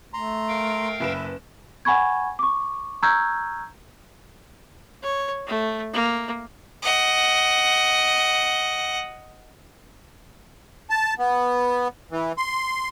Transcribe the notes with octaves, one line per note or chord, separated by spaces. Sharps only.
A3 A#5 C6
A#4 F5 G5
F#1 B4 E5 E7
F#5 G#5 B5 C#6 G#6
C#6 D6
A#5 C#6 E6 F6 G6 G#6
C#5
A3
A#3
D#5 F#5
A5
B3
E3
C6